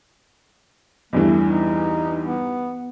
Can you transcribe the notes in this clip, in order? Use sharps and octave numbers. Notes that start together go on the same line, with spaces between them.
E2 G2 E3 A3
D#4
B3